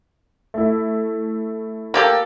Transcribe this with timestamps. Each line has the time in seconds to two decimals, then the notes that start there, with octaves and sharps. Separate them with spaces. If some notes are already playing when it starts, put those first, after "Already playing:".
0.54 A3 E4
1.94 A#3 G4 A4